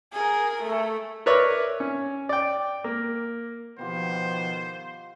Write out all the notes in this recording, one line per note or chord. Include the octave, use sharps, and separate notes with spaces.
G#4 A#4
A3
A#4 B4 C#5 D5 E5
C#4
D5 G5
A#3
B2 D#3 F3 B3 F4 G4 C5